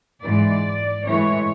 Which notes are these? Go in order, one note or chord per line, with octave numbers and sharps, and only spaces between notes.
G#2 E3 G#3 D5
A2 E3 G#3 C#5